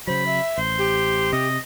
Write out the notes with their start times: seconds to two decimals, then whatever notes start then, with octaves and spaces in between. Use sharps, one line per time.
0.07 C#3 F#3 C5 B5
0.26 E5
0.58 A1 C5
0.78 G4
1.33 C3 D#5